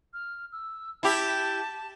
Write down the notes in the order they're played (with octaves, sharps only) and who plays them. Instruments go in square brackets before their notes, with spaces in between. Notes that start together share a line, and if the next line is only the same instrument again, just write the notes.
[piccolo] F6
E6
[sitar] E4 G4 [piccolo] A5